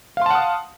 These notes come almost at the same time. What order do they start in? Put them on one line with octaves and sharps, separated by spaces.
F5 C6 A5 F#5 D#6